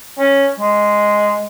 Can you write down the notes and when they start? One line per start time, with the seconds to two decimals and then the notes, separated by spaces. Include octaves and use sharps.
0.19 C#4
0.59 G#3